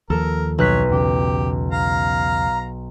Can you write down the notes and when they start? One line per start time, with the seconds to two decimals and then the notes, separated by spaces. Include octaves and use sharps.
0.10 D#2 F3 A4 A#4
0.58 B1 C#5 F#6 B6
0.89 E2 C#3 G4
1.72 F5 A#5